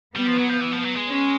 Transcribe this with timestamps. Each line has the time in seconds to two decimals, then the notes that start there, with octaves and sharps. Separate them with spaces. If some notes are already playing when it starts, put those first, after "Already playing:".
0.15 G3 B3
0.28 F3
0.39 F#3
0.50 F3
0.61 E3
0.73 F3
0.84 F#3
0.96 G#3
1.08 C#4